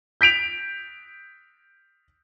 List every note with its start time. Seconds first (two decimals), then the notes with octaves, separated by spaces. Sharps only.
0.21 G6 B6 D7 F7